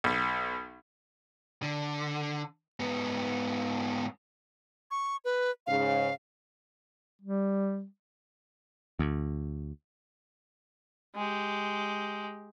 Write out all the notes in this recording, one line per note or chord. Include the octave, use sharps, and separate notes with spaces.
B1
D3
G#2 B3
C#6
B4
G#2 C#3 F5
G3
D2
G#3 G4